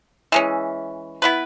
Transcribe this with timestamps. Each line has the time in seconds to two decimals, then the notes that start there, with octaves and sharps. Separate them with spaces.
0.32 E3 G#3 C#4
1.22 B3 E4 B4